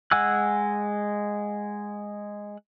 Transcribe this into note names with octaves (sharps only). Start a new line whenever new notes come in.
G#3 F#5 G#5 E6 F#6